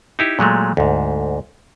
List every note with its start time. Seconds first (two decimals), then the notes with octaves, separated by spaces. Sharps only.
0.19 D#4 E4 G4
0.39 A#2 F#3 G#3 A3
0.77 D2 G#2